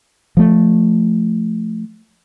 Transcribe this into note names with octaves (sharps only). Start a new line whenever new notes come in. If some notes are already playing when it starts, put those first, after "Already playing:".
F3 A3